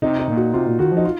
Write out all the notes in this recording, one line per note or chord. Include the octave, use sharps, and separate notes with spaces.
C3 D#4
D#4
A#2
F#4
C3 F4
A#2
D#3 F#4
F3 D#4
F4